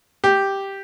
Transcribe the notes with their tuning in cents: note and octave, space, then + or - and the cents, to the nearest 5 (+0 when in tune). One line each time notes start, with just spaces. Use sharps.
G4 +0